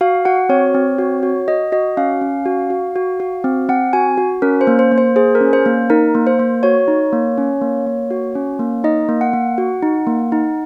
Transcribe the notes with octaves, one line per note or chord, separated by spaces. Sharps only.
F#4 F5
F#4 F#5
C4 C#5
C4
F#4
F#4
F#4 D#5
F#4 D#5
C#4 F5
C#4
F#4
F#4
F#4
F#4
C4
C4 F#5
F#4 G#5
F#4
C#4 A#4
C5
A#3
C5
A#3
C5
G#4 C5
A#4
C#4
C5
A#3
D#4 A#4
A#3
C5
A#3
F#4 C#5
D#4
A#3
C#4
A#3
A#3
F#4
C#4
A#3
D#4 D#5
A#3
F#5
A#3
F#4
D#4
A#3
D#4